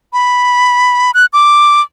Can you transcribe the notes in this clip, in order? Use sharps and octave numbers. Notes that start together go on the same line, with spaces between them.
B5
F#6
D6